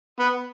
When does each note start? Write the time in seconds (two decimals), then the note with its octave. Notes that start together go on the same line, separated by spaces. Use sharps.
0.19 B3